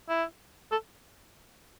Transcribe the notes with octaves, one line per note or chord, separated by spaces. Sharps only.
E4
A4